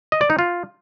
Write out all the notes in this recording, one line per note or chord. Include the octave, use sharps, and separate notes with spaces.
D#5
D5
D#4
F4